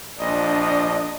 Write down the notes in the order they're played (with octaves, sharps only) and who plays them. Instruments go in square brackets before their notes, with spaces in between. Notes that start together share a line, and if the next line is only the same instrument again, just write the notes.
[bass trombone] A#1 [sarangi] D4 [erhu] D#5